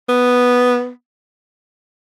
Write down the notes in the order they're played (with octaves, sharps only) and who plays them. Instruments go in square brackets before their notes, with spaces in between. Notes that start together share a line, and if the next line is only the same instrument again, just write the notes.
[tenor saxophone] B3